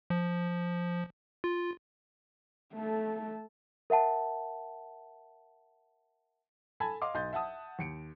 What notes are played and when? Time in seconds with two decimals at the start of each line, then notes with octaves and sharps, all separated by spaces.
0.10 F3
1.44 F4
2.74 A3 A4
3.90 A#4 E5 F#5 A5
6.80 A4 G#5 A5 B5 G#6
7.02 D#5 F5 C6 D6
7.14 B1 D#5 C6 G6 A6
7.33 E5 F#5 A5 D#6
7.79 D#2 C#7 D7